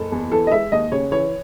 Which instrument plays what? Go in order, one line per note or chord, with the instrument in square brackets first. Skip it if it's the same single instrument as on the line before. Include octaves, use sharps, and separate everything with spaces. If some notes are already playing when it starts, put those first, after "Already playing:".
Already playing: [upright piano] F#1 A4
E2
E3 A4
D#5
G#3 E5
D#2 D#5
C#3 C#5
E3 C#5